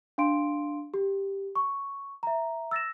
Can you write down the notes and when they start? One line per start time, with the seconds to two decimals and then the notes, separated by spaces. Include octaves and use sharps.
0.18 D4 F5 C6 D7
0.94 G4
1.56 C#6
2.23 E5 A#5
2.71 E6 A6 A#6 E7